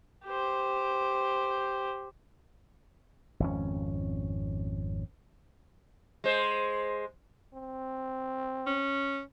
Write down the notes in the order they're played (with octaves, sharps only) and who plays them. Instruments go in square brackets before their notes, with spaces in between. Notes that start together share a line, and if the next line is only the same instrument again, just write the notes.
[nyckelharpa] G4 C5
[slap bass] G#1 F2 C#4
[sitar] G#3 C5
[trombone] C4
[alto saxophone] C#4